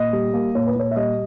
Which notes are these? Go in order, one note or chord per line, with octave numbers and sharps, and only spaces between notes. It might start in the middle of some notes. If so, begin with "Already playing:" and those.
Already playing: A#2 D#5
G3
A#3
A#2 C#5
B4
A#2 C#5
E5
G3 D#5